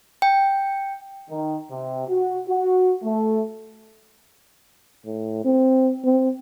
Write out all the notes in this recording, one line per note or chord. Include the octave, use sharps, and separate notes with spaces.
G5
D#3
C3
F#4
F#4
A3
A2
C4
C4